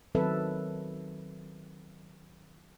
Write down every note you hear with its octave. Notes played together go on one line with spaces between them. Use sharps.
D#3 F#3 C4 A4 B4 E5